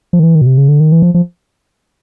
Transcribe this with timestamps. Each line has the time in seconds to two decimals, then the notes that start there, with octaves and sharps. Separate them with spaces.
0.13 F3
0.20 D#3
0.23 E3
0.35 D#3
0.41 B2
0.46 C3
0.58 C#3
0.68 D3
0.80 D#3
0.92 E3
1.02 F3
1.14 F3